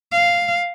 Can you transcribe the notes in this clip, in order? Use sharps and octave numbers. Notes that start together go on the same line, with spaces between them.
F5